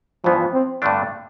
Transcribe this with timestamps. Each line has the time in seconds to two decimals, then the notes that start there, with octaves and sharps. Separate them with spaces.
0.24 G2 E3 F3 B3
0.53 C4
0.82 G2 D3 A3 D4